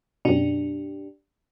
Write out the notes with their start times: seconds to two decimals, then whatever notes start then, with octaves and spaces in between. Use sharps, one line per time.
0.25 F#2 B2 D4 G4